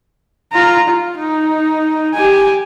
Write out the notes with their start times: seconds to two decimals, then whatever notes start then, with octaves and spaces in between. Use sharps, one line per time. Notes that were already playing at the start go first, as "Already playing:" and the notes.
0.53 F4 A#5
0.88 F4
1.18 D#4
2.14 G4 G#5